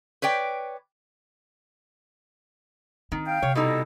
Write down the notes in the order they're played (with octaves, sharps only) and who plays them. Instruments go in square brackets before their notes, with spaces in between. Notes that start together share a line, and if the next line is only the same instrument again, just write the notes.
[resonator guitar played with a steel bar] B4 C#5 D5 G5
[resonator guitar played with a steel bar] D#3 [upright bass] C4
[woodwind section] F5 G5
[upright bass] C3 [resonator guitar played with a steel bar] C#5
[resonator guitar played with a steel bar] B2 G3 D#4 [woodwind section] E4 A4 D#5